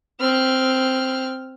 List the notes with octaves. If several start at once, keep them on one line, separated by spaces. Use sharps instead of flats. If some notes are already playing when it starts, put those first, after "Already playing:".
C4 F6